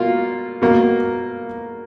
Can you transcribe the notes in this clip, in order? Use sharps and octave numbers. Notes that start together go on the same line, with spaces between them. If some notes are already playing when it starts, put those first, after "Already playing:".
Already playing: B2 A#3 F4
B2 A#3